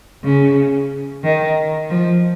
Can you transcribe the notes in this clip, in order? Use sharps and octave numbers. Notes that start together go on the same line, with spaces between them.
C#3
D#3
F3